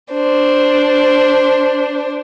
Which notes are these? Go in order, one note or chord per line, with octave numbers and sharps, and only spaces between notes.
D4 C5